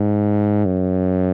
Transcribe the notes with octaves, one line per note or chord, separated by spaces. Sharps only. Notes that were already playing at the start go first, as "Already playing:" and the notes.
Already playing: G#2
F#2